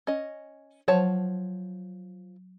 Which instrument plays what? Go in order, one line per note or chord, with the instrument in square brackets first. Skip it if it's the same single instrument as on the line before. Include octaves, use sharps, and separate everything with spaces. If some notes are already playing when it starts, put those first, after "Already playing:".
[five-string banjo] C#4 D#5
[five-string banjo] F3 C#5 A5 [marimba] F#3 C5